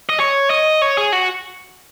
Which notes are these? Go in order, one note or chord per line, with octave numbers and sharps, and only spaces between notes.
D#5
C#5
D#5
C#5
G#4
F#4